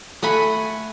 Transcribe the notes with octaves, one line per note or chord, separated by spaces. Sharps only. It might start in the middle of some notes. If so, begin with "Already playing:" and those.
A3 F#5 G#5 B5